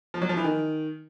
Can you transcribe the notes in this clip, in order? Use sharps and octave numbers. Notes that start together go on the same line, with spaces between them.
F3
F#3
F3
E3
D#3